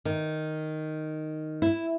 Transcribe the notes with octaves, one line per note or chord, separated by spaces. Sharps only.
D#3
E4